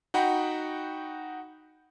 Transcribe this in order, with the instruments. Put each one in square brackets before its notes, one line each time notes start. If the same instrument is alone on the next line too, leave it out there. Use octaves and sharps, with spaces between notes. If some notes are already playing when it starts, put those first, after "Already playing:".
[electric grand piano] D#4 F#4 F#5 G5 B5 G6